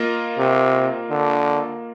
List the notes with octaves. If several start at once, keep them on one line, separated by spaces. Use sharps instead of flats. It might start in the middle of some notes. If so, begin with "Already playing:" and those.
Already playing: A#3 F4 A#4 D#5
C3
D3